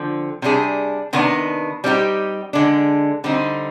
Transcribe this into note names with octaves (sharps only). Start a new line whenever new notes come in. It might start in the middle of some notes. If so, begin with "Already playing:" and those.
Already playing: D3 F3 C4
C3 G3 D4 G#4
C3 D#3 B3 D4
G3 C4 D#4 G4
D3 G#3 D4
D3 G3 C4 D#4